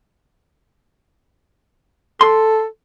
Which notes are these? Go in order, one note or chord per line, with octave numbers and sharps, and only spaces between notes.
A4 C6